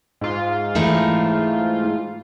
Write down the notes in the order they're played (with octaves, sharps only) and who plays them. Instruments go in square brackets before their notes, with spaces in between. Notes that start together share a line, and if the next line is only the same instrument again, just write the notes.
[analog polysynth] G#2 F4
[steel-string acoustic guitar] E3 A3 D#4